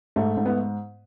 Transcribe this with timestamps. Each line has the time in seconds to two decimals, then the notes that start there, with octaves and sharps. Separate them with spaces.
0.16 G#2 A3
0.37 G#2
0.46 B3